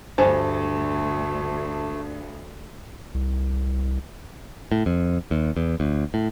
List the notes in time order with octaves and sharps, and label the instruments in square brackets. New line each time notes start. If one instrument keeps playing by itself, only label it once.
[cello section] D2 [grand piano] G2 [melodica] A3 [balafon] C5 G#5
[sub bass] C2
[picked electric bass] A2
F2
D#2
E2
D2
A2